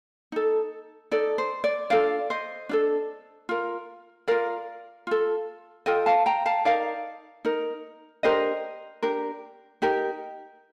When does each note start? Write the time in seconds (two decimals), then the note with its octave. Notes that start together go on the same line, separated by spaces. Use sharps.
0.32 D#4 A4
1.11 D#4 A4 D5
1.38 C5
1.64 D5
1.90 D4 F4 A4 D5 F5
2.30 C5 D#5
2.69 D4 F4 A4
3.49 F4 A#4
4.28 F4 A#4 D5 F5
5.07 F4 A4
5.86 F4 A4 D#5 G5
6.06 F5 A5
6.26 G5 A#5
6.46 F5 A5
6.65 D#4 A#4 D5 F5
7.45 D#4 A#4
8.23 D4 G4 A#4 C5 D#5
9.02 D4 G4 A#4
9.82 D#4 G4 A#4